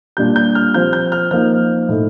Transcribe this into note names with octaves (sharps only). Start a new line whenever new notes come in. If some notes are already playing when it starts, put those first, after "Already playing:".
A#2 G3 D4 F4 G6
G6
F6
F3 C4 F4 G6
G6
F6
F3 A#3 D#4 F6
A2 A3 D#4